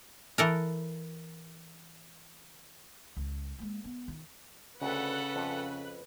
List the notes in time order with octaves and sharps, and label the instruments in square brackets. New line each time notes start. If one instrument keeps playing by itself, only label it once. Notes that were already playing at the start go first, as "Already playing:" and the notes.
[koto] E3 A4 A#4
[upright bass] C#2
G#3 A#3
B3
D#3 F4
[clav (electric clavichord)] D2 C4 [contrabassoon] C#3 [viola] A4 F#5 [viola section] B4
[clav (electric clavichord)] F2